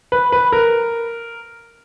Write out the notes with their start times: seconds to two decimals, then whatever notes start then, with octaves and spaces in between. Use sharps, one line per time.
0.12 B4
0.32 B4
0.52 A#4